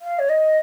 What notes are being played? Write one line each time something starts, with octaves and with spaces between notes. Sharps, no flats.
F5
C#5
D#5